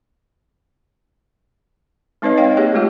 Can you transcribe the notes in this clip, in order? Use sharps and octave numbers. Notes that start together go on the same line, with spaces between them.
G#3 C4 D#4 B4 C#5 D#5
C#5 D#5 F5 G5
A#3 G4 G#4 C#5
G#3 A3 F4 G4